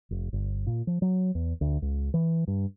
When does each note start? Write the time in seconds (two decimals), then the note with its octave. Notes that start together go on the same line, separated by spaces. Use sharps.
0.11 F1
0.33 G1
0.67 A#2
0.87 F3
1.02 F#3
1.35 E2
1.61 D2
1.82 C#2
2.14 E3
2.48 G2